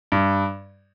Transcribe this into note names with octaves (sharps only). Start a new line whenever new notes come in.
G2